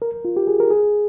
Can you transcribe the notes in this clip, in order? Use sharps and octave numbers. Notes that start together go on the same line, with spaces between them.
A#4
F4
G4
G#4
A#4
G#4